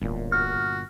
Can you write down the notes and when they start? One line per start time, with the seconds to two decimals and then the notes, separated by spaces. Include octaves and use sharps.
0.01 D1 G1 A#2
0.32 F#4 F6